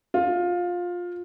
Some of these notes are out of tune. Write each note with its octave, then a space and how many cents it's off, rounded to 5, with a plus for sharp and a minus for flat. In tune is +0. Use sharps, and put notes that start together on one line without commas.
F4 +15